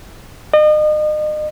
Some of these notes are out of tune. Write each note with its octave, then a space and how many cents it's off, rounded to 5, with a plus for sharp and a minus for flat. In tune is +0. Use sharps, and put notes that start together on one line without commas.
D#5 -40